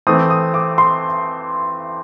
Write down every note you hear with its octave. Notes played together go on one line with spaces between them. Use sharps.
E3 A3 C4 D#6
D#6
D6
C6